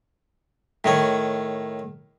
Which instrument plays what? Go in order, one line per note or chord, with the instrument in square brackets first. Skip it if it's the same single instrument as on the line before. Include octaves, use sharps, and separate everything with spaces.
[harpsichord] A2 D#3 C#5